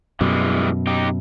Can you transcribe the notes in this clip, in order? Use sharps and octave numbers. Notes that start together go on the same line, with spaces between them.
F#2 B2 E3 G3 G#3
D#4 G4